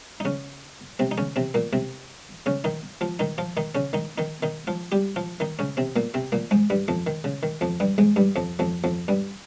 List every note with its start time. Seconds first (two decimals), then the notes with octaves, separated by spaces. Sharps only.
0.20 D#4
0.25 C#3 C#4
0.99 C3 C4
1.11 D#4
1.18 C#3 C#4
1.36 C3 C4
1.54 A#2 A#3
1.73 C3 C4
2.46 C#3 C#4
2.64 D#3 D#4
3.01 F3 F4
3.19 D#3 D#4
3.38 F3 F4
3.57 D#3 D#4
3.75 C#3 C#4
3.93 D#3 D#4
4.18 D#3 D#4
4.43 D#3 D#4
4.67 F3 F4
4.92 G3 G4
5.16 F3 F4
5.40 D#3 D#4
5.59 C#3 C#4
5.77 C3 C4
5.96 A#2 A#3
6.14 C3 C4
6.32 A#2 A#3
6.51 G#2 G#3
6.70 G2 G3
6.88 F2 F3
7.07 D#3
7.24 C#3
7.43 D#3
7.61 F2 F3
7.80 G2 G3
7.98 G#2 G#3
8.16 G2 G3
8.36 F2 F3
8.59 F2 F3
8.84 F2 F3
9.08 G2 G3